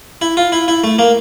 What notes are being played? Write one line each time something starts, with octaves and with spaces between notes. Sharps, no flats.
E4
F4
E4
E4
A3
A#3